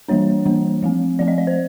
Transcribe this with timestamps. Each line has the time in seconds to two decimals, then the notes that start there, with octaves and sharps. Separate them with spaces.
0.09 E3 G3 A#3 D4 C#5
0.46 E3 G3 A#3 D4
0.83 F3 A3 C4
1.19 F3 A3 C4 D5
1.28 D#5
1.38 D5
1.47 C5